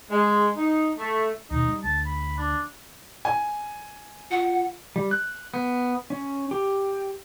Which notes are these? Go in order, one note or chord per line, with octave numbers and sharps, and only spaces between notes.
G#3
D#4
A3
D#2 B2 D#4
G3
D2 A5
B5
D4
G#5
F4 F#5
G3
F#6
B3
C#4
G4